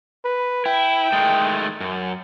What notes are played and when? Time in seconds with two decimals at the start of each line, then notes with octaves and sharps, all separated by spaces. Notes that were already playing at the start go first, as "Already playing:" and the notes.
0.25 B4
0.66 E4 G5
1.12 D#3 G#3 A3
1.80 F#2